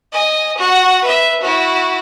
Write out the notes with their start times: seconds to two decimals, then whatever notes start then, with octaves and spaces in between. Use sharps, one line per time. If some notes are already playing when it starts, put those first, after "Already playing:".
0.12 D#5 G#5
0.57 F#4 F#5
1.04 B4 E5
1.41 E4 F#4